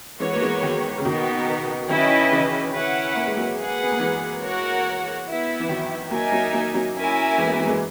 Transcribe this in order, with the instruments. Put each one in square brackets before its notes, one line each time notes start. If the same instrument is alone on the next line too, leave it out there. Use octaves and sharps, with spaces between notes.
[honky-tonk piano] E3 G#3 [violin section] B3 F#4 A#4 C#5
[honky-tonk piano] A#3
E3 G#3
D#3 F#3
C#3
[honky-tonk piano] B2 D#3 [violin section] B3 D#4 A#4
[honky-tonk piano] D#3 F#3 [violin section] C#4 E4 B4 D#5
[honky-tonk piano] C#3 E3
[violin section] C#4 E4 B4 F#5
[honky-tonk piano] A#3
G#3
F#3 A#3
[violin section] G#4 B4 F#5
[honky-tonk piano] B3
A#3
E3 G#3
[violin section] F#4 A#4 C#5 F#5
B3 E4 B4 E5
[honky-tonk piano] E3
D#3 F#3
[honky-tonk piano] F#3 A#3 [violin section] D#4 A#4 E5 G#5
[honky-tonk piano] F#3 A#3
F#3 A#3
F#3 A#3
[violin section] C#4 E4 A#4 E5 G#5
[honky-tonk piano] E3 G#3
G#3 B3
E3 G#3
A#3
E3 G#3